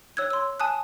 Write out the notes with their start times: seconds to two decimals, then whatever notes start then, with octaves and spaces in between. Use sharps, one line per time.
0.17 C#5 E6 F#6 G#6
0.30 C6 E6
0.60 G#5 A5 D#6 F#6